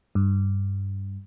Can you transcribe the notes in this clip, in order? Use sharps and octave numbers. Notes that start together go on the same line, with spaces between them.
G2